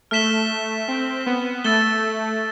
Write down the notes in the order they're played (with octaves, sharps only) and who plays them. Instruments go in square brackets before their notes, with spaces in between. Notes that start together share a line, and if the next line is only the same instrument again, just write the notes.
[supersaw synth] A3 [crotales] F6 B6 E7 G7
[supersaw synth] C4
B3
[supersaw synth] A3 [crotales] E6 A6 E7 G7